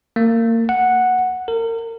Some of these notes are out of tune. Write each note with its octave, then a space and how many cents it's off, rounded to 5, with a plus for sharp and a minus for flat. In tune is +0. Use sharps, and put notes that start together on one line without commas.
A#3 -30
F#5 -5
A#4 -35